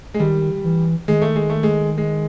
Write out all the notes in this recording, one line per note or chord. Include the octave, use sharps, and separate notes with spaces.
G#3
D#3 G3
E3
D#3 G#3
A3
G#3
A3
G#3
G#3